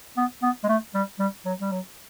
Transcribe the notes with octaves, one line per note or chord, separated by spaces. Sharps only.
B3
B3
G#3
A3
G3
G3
F#3
G3
F#3